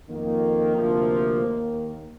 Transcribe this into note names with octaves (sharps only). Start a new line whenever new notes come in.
F2 D#3 A#3
D2 C3 F3
D#2 D#3